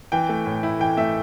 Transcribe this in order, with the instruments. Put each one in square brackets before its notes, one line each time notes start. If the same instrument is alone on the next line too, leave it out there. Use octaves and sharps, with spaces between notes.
[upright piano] E3 G5
A3
A2
E4
E3 G5
A3 E5